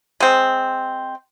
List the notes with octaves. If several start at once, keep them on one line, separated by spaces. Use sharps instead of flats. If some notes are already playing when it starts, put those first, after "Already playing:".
G#3 C4